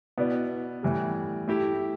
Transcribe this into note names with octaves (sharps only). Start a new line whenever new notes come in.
B2 B3 E4 B4 D5
A2 E3 G3
A3 E4 G4